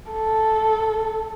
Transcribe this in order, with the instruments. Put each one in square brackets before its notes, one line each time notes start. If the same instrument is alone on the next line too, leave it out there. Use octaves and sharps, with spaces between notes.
[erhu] A4